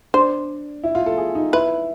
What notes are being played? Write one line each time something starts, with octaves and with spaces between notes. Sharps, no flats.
D4 C5
E4
F4
A4
G#4
D#4
E4 B4